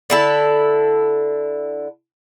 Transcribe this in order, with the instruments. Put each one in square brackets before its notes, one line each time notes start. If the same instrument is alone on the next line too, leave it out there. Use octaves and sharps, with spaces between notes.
[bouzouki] D3 E4 A4